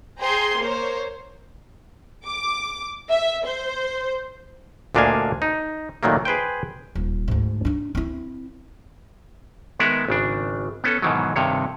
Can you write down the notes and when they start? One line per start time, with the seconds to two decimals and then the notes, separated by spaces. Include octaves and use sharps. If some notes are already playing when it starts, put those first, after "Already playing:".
0.20 G#4 C5 G5 A#5 C6
0.57 A#3 A#4 C5 C#5
2.25 D6
3.09 E5
3.44 C5
4.95 D2 A#2 D4 D#5 F5 G#5
5.42 D#4
6.03 A#2 D#3 F#3 A3 A#3
6.25 G#4 B4 C5 G5
6.95 D#1
7.28 D2 G#2
7.65 D4 D#4
7.95 C4 E4
9.79 D#3 G#3 B3 A#4 E5 F#5
10.08 G#1 C#3 D4
10.84 B3 C#4 A4
11.02 G#2 B2 D#3 E3 F#3
11.36 G2 C3 D#3 C#5